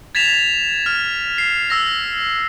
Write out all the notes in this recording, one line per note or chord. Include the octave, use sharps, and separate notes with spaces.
G#6 A6 B6 E7 F7
F6
C7
E6 A#6